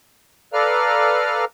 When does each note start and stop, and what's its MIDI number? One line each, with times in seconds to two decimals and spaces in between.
0.53 1.45 69
0.53 1.45 71
0.53 1.45 74
0.53 1.45 77
0.53 1.45 82
0.53 1.45 89